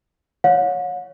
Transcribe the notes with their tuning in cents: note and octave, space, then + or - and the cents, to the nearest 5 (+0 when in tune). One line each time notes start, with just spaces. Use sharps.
C#5 +5 F#5 -45